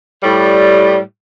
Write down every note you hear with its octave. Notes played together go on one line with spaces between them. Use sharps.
A2 G3